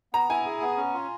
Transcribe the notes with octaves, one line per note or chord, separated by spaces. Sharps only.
B3 A#5
E4 G#5
G#4
B3
C#4
F4